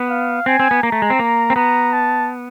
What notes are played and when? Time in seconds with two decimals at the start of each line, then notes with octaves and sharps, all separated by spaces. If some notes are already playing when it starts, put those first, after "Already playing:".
Already playing: B3
0.10 F5
0.46 C4 G#5
0.60 C4
0.71 B3
0.83 A#3 A#5
0.92 A3
1.02 G#3
1.10 C4
1.19 A#3
1.50 C4
1.56 B3 A#5
1.93 A5